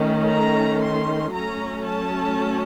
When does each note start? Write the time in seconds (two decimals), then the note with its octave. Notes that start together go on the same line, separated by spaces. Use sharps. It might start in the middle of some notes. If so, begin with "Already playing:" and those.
Already playing: D#3 A3 C#4
0.30 A#5
0.81 C6
1.33 F#3 A3 C#4 A#5
1.86 A5